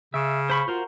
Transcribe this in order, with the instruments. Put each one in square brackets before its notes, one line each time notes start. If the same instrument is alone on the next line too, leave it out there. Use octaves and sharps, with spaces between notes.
[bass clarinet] C#3 [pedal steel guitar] E5
[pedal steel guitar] C5 B5 C#6
[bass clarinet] F4 [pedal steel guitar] F#4 A#4 C5